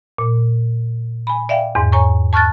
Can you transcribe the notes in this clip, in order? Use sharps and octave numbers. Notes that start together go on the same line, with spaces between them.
A#2
G#5 B5
D5 E5 F5 G5
E2 G#2
C#5 G#5 A#5 C#6
A5 C#6 F6 F#6 A6